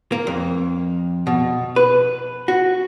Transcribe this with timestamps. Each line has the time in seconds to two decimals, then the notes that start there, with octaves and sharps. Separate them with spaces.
0.12 A#3
0.27 F2
1.27 B2
1.76 B4
2.48 F#4